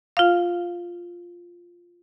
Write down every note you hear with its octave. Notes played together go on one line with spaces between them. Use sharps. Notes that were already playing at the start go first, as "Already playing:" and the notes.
F4 F5